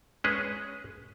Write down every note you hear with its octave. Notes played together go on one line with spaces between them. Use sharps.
G#3 C#4 G#4 B4